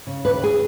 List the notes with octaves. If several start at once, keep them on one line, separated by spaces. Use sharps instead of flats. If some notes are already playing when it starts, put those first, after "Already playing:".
C#3
D#2 B4
G#4